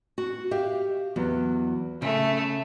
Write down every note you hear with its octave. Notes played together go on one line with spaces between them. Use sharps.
F#4
G4 E5 F5
E2 F#3
C#3 A3